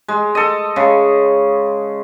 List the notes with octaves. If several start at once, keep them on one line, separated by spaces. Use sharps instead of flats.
G#3
A4 D#5
C#3 G#3